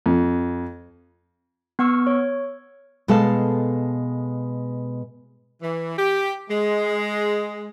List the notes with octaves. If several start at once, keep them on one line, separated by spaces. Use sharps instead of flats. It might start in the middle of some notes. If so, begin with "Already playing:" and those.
F2
B3 F#5 C#6 E6 F6
C#5
B2 G#3 A4 F5 A5
E3
G4
G#3